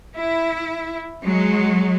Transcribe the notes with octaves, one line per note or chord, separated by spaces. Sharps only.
E4
F#3 G#3